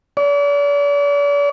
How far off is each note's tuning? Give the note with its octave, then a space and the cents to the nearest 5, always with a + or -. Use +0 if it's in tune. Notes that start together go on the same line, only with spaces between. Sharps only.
D5 -45